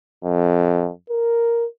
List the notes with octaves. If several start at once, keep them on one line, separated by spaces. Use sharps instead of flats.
F2
A#4